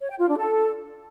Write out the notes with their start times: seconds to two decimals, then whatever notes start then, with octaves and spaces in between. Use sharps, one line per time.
0.01 C#5
0.10 G5
0.19 F4
0.28 D4
0.38 A4